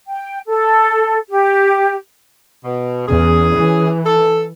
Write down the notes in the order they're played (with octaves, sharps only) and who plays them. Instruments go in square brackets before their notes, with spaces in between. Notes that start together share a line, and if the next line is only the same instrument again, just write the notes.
[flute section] G5
A4
G4
[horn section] B2
[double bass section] E2 [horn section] C#4 G#4
[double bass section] E3
[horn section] A4